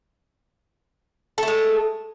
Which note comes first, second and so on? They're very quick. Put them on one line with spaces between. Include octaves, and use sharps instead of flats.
A4 A3 G#3